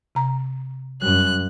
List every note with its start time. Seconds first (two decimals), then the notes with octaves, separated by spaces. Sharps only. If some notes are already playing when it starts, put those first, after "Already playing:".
0.15 C3 A#5
1.02 F#2 G3 F#6